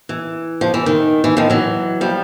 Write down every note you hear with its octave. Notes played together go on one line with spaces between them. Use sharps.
E3
F3
E3
D#3
E3
D#3 F3
E3 F#3
F3 G3